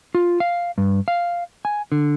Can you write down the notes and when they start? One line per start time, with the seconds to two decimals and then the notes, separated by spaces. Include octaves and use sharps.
0.15 F4
0.40 F5
0.78 G2
1.08 F5
1.65 G#5
1.92 D3